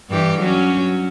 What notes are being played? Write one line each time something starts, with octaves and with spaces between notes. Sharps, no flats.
G2 E3 G4
F#3 C#4